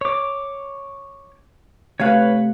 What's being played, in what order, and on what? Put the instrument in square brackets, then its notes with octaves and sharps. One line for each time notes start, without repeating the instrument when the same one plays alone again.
[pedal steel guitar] C#5 D6
[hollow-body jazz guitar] C3 A3 F5 [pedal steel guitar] B4 C#5